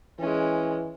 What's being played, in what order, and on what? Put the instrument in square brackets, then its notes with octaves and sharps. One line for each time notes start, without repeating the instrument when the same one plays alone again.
[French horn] E3 [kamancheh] G#3 C#4